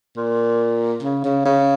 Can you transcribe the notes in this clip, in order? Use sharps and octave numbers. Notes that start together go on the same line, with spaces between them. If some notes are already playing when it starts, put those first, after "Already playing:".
A#2
C#3
C#3
C#3